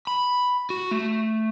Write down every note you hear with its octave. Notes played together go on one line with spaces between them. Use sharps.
B5
F#4
A3